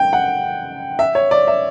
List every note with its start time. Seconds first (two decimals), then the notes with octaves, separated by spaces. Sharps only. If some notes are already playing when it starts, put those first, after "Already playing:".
Already playing: G5
0.13 F#5
0.99 E5
1.15 C#5
1.31 D5
1.47 E5